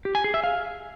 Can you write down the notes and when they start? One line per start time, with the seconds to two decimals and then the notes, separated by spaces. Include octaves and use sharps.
0.05 G4
0.15 G#5
0.24 G#4
0.34 E5
0.44 F5